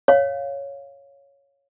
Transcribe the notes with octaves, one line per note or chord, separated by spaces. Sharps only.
C#5 F5